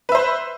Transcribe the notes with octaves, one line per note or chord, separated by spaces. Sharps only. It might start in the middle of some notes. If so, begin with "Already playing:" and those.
B4 C5 E5